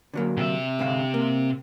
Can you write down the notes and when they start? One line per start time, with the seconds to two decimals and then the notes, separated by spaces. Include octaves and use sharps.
0.14 D3 F#3 A#3
0.37 C3 E5
0.79 G#2 D3 F5
1.14 A#3